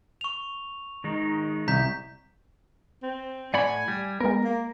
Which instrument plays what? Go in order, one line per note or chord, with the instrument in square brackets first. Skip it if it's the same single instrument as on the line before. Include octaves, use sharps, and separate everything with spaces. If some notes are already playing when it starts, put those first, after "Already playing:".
[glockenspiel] C#6 F7
[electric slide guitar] D#3 G#3 D#4
[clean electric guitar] C2 [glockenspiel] A#5 G6 B6
[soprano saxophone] C4
[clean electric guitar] A2 F#5 B5 [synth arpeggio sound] D5 [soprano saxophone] G#5
[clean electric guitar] G3
[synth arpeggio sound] G#3 B3 [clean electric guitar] A#4
[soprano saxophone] A#3